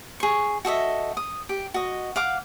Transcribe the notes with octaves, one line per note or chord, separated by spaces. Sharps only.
G#4 C#6
F#4 A4 D#5 E5
D#6
G4
F#4 D#5
F5 F#5 D6